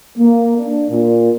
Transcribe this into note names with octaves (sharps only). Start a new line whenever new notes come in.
A#3
D4
A#2